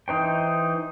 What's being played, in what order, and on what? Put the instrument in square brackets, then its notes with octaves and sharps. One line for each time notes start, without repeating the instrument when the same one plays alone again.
[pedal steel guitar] E3 D#4 C5 G5